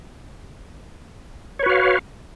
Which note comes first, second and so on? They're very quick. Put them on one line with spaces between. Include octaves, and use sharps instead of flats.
C#5 B4 F#4 F5